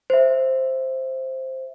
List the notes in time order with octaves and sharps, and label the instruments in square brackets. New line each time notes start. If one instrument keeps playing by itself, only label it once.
[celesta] C5 E5